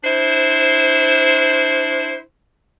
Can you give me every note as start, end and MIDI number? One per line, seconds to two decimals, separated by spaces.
0.04 2.19 62
0.04 2.19 64
0.04 2.19 72